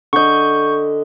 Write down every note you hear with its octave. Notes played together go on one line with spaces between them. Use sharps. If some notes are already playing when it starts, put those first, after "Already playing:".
D3 D#5 C#6 G6